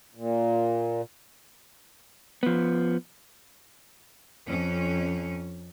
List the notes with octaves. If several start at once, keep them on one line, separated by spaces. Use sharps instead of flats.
A#2
F3 B3
F2 C#4